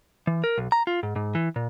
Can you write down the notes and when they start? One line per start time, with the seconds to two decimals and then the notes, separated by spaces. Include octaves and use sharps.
0.27 E3
0.44 A#4
0.58 B1
0.72 A#5
0.87 F4
1.03 G#2
1.16 G#2
1.35 E3
1.56 A#2